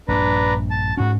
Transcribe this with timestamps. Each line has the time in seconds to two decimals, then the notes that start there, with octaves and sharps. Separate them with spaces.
0.08 A#1 G2 D4 B4 A#5
0.71 A5
0.97 G#2 C#4 F#4